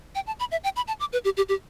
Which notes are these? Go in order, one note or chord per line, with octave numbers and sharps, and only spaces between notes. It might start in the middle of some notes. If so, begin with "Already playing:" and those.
G5
A5
B5
E5
G5
B5
A5
D6
B4
G4
G4
G4